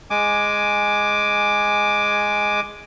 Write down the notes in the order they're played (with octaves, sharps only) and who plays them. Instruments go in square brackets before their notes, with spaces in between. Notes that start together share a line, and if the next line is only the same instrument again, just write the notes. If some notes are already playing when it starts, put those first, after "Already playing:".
[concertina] G#3 G#5 D6